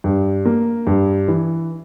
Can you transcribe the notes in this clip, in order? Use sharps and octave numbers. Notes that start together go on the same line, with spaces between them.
G2
A#3
G2
E3